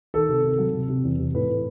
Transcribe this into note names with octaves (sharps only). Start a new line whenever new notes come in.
D#3 A4
C3
C3
F#3
C3
C3
E2
C3
A2 B4
A2